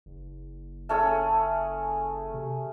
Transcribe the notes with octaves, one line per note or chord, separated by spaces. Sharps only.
F#1
A3 C#4 G#4
C3